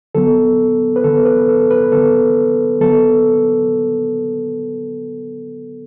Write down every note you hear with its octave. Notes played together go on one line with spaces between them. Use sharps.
D3 F#3 B3 A4
B4
D3 F#3 B3 A4
B4
A4
B4
D3 F#3 B3 A4
D3 F#3 B3 A4